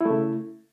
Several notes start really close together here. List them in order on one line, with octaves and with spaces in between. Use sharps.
E4 A3 C#3